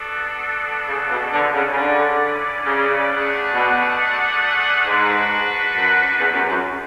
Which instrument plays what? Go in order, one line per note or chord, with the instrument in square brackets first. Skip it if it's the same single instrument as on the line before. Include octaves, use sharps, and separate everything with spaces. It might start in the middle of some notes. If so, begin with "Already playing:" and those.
Already playing: [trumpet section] B3 D4 F#4 A4
[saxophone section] C#3
B2
[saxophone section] D3 [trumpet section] C#4 E4 B4 D5
[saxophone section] C#3
C#3
D3
C#3
[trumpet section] A3 D4 G#4 D5 F#5
[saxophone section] B2
[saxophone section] G#2 [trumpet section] D4 F#4 B4
[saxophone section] F#2
E2
F#2
F#2